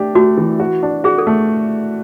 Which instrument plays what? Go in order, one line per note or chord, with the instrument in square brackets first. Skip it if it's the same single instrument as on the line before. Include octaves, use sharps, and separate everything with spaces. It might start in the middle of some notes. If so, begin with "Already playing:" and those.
Already playing: [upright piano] A3 D4 G4
[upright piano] A3 [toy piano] F#4
[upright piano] E3
F#4
D4
[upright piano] F#4 [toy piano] G#4
[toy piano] A4
[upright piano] A3